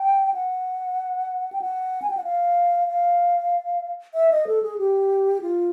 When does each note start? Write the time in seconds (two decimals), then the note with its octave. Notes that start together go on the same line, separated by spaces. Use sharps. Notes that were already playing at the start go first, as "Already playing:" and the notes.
Already playing: G5
0.34 F#5
1.52 G5
1.62 F#5
2.02 G#5
2.10 G5
2.17 F#5
2.24 F5
2.88 F5
4.14 E5
4.31 D#5
4.47 A4
4.63 G#4
4.78 G4
5.41 F4